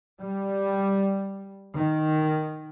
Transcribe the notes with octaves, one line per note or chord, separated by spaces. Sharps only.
G3
D#3